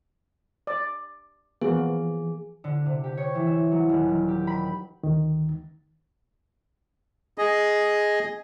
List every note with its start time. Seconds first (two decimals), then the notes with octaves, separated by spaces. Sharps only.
0.67 D5
1.62 E3 F3 A#3 B3 F#4 G#4
2.64 D3
2.86 C3
3.04 G4
3.17 C#5
3.35 E3
3.47 E5
3.72 F#3
3.89 D#1
4.09 D#3
4.28 G4
4.47 B5
5.03 D2 D#3
7.38 G#4 D#5